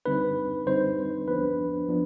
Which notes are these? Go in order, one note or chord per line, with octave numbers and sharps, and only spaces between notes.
D3 G3 C4 D#4 B4
D3 G3 C4 D#4 C5
F3 B3 D4 B4
F3 B3 D4